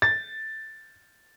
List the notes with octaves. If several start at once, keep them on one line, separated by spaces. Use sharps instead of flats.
A6